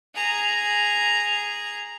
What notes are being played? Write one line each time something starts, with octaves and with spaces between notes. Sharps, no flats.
G#4 A#5